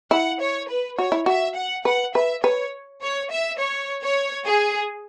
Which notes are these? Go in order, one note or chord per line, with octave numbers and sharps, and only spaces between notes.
E4 F#5
C#5
B4
F#4 C#5
E4
F#4 E5
F#5
B4 F#5
B4 E5
B4 C#5
C#5
E5
C#5
C#5
G#4